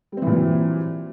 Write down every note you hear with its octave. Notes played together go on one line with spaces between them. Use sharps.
A#2 E3 F#3 G3 C4